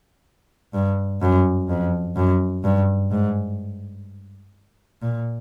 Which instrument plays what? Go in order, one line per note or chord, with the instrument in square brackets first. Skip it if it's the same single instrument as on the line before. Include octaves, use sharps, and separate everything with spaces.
[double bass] G2
F#2
F2
F#2
G2
G#2
A#2